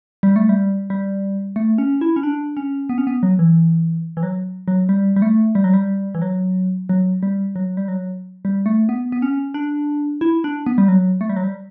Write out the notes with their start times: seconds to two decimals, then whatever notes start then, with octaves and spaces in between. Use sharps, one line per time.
0.23 G3
0.36 A3
0.49 G3
0.90 G3
1.56 A3
1.78 C#4
2.01 E4
2.16 C#4
2.23 D4
2.57 C#4
2.89 B3
2.98 C#4
3.07 B3
3.23 F#3
3.39 E3
4.17 E3
4.23 F#3
4.68 F#3
4.89 G3
5.16 G3
5.22 A3
5.55 G3
5.64 F#3
5.74 G3
6.15 E3
6.22 F#3
6.89 F#3
7.23 G3
7.56 F#3
7.77 G3
7.88 F#3
8.45 G3
8.66 A3
8.89 B3
9.12 B3
9.22 C#4
9.54 D4
10.21 E4
10.44 D4
10.67 B3
10.78 G3
10.88 F#3
11.21 A3
11.29 G3
11.36 F#3
11.44 G3